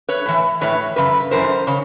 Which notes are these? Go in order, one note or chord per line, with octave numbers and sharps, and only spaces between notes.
B4 C#5
A2 E3
A2 E3 B4 C#5
F#2 C#3 B4
B4
F#2 C#3 E3 A#4 C5
C#3 C#5